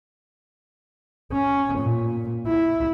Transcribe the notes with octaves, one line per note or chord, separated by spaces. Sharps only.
C#4
A#2
E4